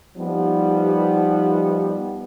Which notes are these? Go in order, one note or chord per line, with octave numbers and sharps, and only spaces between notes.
F3 G3 B3 D#4